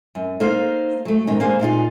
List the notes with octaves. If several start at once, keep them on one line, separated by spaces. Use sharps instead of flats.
F#2
A#3 D#4 A4 C5 F5
F#3 A3
G#2 B2 D#3 C#4
A#3 D4 G#4 C5 F5
A#2 D#4 F4 G#4